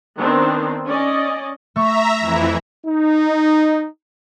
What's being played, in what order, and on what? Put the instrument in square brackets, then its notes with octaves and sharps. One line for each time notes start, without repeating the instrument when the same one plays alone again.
[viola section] D#3 B3 C4 D4
C#4 D5 D#5
[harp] A3 C#6 [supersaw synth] E5 A#5
[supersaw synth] F2 E3 E4
[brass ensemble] D#4